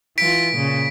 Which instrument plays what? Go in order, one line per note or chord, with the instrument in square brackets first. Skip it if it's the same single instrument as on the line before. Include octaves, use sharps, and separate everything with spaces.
[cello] E3 F4 [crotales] B6 D7
[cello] A#2 C#3